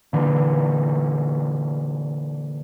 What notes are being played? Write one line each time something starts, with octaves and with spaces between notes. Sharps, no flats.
A#2 D3 E3